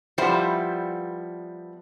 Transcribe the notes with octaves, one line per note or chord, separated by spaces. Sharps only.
F3 G3 B3 E4 C5